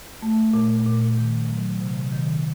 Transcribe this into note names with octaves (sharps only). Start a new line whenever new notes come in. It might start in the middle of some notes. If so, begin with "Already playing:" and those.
A3
A#2
A#2
D#3
F#3
C3
D#3